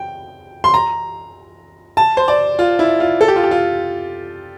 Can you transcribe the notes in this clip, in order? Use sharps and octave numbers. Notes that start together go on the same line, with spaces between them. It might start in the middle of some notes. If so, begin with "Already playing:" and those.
Already playing: G5
C6
A#5
A5
C5
D5
F4
E4
F4
A4
G4
F4
G4
F4